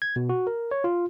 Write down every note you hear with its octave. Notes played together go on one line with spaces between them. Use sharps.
G#6
B2
F#4
A#4
C#5
F4